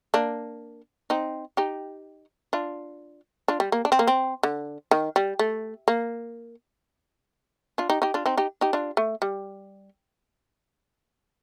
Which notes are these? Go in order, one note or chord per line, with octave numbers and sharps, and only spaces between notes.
A#3 D4
C4 D#4
D#4 G4
D4 F4
D4 F4
G3
A#3
D4
C4
A#3
C4
D3
D#3
G3
A3
A#3
D4 F4
D#4 G4
D#4 G4
D4 F4
C4 D#4
D#4 G4
D#4 G4
D4 F4
A3
G3